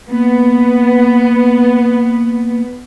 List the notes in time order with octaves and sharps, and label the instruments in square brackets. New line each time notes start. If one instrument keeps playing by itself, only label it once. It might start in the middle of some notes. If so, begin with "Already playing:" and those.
[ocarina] A#3 [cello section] B3